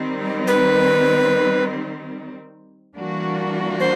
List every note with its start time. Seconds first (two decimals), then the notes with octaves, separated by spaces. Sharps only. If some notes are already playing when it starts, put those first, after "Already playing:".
Already playing: D#3 G3 C4
0.47 B4
2.97 E3 G3 A#3 D4 F#4
3.80 C5